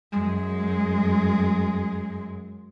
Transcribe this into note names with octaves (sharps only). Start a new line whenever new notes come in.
F#2 G#3